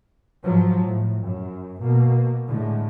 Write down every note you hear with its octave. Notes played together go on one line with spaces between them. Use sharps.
G#2 F3 F#3
A2
F#2
B2 A#3
A2 D3 G#3